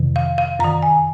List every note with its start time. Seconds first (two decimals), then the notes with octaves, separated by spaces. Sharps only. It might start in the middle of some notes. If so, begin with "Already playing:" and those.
Already playing: F2 C3 D#3
0.16 F5
0.38 F5
0.59 F#2 D#3 A#5
0.83 G#5